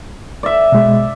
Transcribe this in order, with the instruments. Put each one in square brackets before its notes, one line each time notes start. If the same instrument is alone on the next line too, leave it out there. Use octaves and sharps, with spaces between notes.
[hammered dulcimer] D5 E5
[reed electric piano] B2 G#3